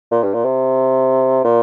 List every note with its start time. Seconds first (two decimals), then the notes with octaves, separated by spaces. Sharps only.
0.11 A#2
0.23 G2
0.34 A#2
0.45 C3
1.45 A#2